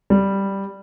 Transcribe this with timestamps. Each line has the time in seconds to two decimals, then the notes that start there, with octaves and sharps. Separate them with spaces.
0.10 G3